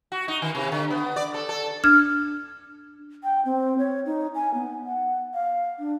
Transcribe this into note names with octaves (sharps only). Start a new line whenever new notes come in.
F#4
D#4
D#3
C3
D3
B3
D5
A4
A4
D4 F6 G#6
G5
C4
C#5
D#4
G#5
B3
F#5
F5
D4